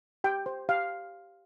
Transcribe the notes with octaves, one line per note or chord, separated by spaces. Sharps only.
G4 G5
C5
G4 F5